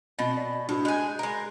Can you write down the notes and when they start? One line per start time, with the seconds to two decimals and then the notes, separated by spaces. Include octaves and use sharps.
0.19 B2 C4 D#5 A6
0.37 D5
0.69 A2 D4 F#4
0.85 G#3 G#5 B5 F#6 G6
1.19 G#3 A#4